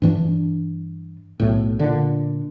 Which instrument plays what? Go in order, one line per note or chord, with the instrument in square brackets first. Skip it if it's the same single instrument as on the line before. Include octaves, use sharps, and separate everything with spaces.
[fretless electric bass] G2 E3 C#4 D4
B1 A2
A#2 D3